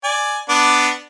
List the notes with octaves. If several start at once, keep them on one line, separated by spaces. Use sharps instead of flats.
D5 G#5
B3 D4 D6